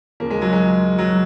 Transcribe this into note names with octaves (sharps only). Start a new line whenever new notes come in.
D#2 C#3 F3 A#3
G#3
F#3
G#3
F#3